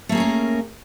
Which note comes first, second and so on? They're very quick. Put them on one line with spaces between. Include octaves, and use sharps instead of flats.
A3 A#3 G#4 C#4 A#4